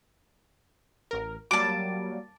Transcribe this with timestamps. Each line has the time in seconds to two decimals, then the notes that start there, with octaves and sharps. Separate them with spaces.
1.11 A1 A#4
1.51 F#3 G3 A#3 A5 D6